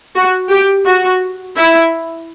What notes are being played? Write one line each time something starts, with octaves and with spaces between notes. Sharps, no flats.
F#4
G4
F#4
E4